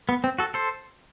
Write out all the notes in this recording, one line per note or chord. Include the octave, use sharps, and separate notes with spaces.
B3
C4
F#4 A4
A4 C5